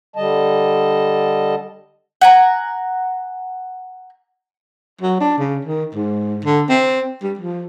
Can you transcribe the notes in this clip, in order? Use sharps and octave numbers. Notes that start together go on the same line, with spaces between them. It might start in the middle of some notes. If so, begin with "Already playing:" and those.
D3 G3 D#5 A5
F#5 G#5 A#5
F#3
D4
C#3
D#3
G#2
D3
C4
G3
F3